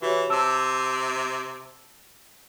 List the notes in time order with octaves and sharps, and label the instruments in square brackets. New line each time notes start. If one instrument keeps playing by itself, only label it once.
[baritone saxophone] E3 [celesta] F#4 G4 C#5
[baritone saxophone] C3 [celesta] A5 E6 E7